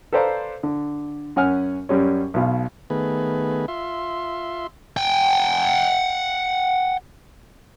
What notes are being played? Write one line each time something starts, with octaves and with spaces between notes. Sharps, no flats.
A4 B4 C5 D5 F5 A#5
D3
F#2 C#4 F#5 G#5 F6
F#2 G3 C#4
B1 B2 F5
D#3 A3 B3 G#4 B4
F4 E5 C6
F#5 G5